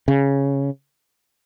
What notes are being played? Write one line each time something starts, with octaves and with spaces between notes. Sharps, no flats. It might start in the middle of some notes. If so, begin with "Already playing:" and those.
C#3